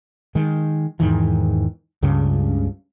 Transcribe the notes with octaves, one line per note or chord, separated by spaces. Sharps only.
D#3 G#3
E2 G#2 D#3 E3
C#2 G2 C#3